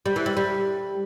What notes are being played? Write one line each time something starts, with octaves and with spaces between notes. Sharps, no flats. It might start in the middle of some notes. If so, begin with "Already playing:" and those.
G3
E3
G3
G3